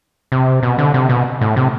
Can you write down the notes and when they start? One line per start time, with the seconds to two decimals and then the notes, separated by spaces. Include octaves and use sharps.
0.32 C3
0.63 B2
0.78 D3
0.94 C3
1.09 B2
1.41 A2
1.56 C3